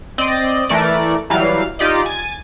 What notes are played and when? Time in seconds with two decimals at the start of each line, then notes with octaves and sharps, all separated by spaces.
0.18 C4 D5 D#5
0.69 E3 A3 A#4 D5
1.30 E3 F#3 G3 F5 F6
1.79 D#4 F4 G4 D5 D#5
2.05 G#5 G#6 A6